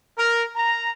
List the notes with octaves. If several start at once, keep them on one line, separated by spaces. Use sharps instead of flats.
A#4
A#5